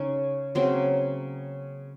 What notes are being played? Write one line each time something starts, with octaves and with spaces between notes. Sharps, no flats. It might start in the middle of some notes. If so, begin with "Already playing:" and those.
Already playing: C#3 C#4 D#4
C#3 F#3 A#3 C4